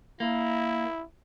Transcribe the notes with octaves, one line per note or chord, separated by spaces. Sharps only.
A#3 E4